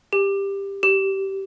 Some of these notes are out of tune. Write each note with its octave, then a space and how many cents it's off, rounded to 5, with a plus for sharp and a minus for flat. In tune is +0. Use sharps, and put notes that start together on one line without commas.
G4 +15
G4 -15